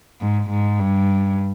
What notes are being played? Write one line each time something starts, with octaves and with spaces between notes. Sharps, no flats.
G#2
G#2
G2